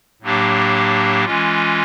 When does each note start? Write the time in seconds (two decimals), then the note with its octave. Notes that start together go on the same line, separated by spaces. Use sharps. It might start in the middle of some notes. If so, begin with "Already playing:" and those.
0.22 A2 F#3 A#3 D4 G4
1.25 E3 G#3 C#4 F4